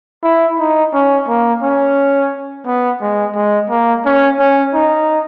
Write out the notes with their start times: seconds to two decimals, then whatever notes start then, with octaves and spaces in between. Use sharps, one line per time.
0.23 E4
0.59 D#4
0.93 C#4
1.28 A#3
1.62 C#4
2.66 B3
3.01 G#3
3.35 G#3
3.70 A#3
4.05 C#4
4.39 C#4
4.73 D#4